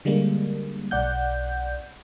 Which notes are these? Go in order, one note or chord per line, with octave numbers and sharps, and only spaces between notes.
D3 G3 G#3 A#3
B1 D5 F#5 G6